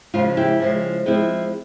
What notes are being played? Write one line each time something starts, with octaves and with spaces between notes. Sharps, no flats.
C#3 F3 G#3 F4
E4 G4
C#3 F3 G#3
F3 G#3 C4 E4